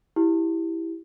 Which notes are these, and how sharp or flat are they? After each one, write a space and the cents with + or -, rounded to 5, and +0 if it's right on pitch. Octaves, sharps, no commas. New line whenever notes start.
E4 +0 G4 +0